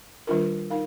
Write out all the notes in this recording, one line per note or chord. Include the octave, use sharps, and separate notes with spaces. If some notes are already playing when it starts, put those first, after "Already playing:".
D#3 G3 D4 F4 A#4
D#4 A#4 F5